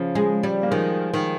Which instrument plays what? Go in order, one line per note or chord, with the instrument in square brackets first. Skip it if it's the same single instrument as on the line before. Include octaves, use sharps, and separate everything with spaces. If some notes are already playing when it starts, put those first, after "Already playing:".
Already playing: [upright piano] C#3 F3
[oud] G#3
G3
[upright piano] A#3
[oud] D#3 [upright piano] F3 G#3
[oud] D#3